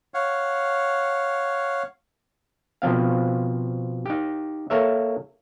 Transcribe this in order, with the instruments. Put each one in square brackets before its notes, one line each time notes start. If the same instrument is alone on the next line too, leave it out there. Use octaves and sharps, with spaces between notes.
[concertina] C#5 F5 F#5
[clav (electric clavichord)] B2 F3 C4 F5
D#4 G4
A#3 A4 A#4 C#5 E5